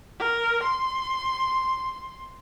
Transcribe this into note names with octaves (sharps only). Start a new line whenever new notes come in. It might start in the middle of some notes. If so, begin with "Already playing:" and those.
A#4
C6